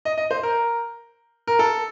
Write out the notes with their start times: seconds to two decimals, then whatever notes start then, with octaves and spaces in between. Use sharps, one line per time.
0.05 D#5
0.18 D#5
0.31 C5
0.43 A#4
1.47 A#4
1.59 A4